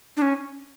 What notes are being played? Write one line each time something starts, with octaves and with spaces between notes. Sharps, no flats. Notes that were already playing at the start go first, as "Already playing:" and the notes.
D4
C#4